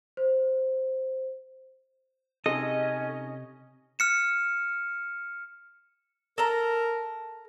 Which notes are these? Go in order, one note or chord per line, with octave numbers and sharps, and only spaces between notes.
C5
C3 C#4 D#4 G#4 A4 D#5
F6 C#7 E7
A4 A#4 A#5